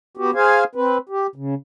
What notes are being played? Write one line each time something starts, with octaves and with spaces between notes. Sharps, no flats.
B3 F#4 G4
G#4 C5 F5 G#5
C4 B4
G4
C#3